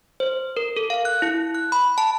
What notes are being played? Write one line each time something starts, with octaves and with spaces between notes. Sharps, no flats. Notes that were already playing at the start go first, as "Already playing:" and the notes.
C5
A#4
A4
F5
F#6
E4
F#6
B5
A5